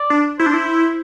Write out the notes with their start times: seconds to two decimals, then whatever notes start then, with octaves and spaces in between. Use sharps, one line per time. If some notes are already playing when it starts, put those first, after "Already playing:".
Already playing: D5
0.10 D4
0.39 E4 C5
0.46 D4
0.54 E4